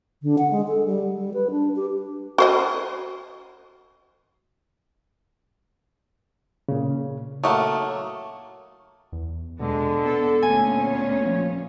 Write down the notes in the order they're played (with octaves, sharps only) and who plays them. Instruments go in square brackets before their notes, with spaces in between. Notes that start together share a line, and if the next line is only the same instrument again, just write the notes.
[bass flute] D3
F#5
G#3
A4
G3
G3
B4
D4
G4
[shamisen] F#4 C5 D#5
[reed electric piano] A#2 C#3
[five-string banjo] F#3 A3 A#3 [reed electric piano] A5 D#6
[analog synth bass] E2
[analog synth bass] B2 [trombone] D3 [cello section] G#3
[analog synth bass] B3 [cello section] A4
[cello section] D2 A#2 C#4 [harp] G#5
[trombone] C#5
[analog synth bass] F3